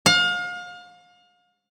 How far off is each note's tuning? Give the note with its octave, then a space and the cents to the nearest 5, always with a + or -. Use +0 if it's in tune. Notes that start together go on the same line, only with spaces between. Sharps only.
F5 +35